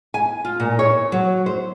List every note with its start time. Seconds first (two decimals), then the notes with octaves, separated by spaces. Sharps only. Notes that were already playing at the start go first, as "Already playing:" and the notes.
0.14 G#5
0.45 F4
0.60 A#2
0.79 C#5
1.12 F#3
1.46 C5